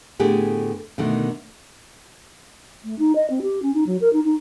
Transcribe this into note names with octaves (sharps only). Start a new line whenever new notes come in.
A2 D3 B3 G4 G#4
B2 D3 D#3 A3
A3
D#4
D#5
C4
G4
C#4
D#4
F#3
A#4
D#4
D#4